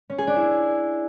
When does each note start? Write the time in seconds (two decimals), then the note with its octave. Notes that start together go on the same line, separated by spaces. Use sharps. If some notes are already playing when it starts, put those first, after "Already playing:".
0.10 C#4
0.18 G#4
0.27 D4
0.36 E4